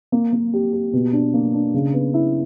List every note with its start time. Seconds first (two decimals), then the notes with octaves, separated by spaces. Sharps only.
0.12 A#3
0.33 A#3
0.54 G4
0.73 G4
0.93 B2
1.13 D4
1.34 A#3
1.54 D4
1.74 C#3
1.93 B3
2.14 E4